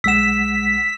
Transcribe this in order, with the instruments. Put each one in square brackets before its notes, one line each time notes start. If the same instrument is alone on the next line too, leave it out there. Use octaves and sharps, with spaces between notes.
[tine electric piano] B1 G#3 F#5 [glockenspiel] E6 E7 [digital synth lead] B6